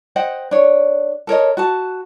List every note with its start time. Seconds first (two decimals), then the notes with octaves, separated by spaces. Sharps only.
0.16 C5 D#5 F#5 G5
0.51 D4 C#5
1.27 A4 A#4 C#5 D#5
1.57 F#4 F#5 A5